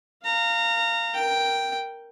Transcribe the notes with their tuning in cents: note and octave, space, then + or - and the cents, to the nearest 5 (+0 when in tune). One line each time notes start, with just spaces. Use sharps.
F5 -5 A#5 -25
A#4 +0 G5 +0